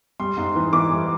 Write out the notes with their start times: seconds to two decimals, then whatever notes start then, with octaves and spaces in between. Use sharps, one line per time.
0.20 G3 C6
0.37 G#2
0.55 E3
0.73 E3 D6
0.91 G3